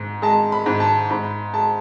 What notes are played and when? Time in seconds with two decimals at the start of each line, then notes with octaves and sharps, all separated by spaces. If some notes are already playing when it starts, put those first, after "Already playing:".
Already playing: G#2
0.22 G#3 A5
0.52 B5
0.66 G#2
0.80 A5
1.09 G#2 B5
1.54 G#3 A5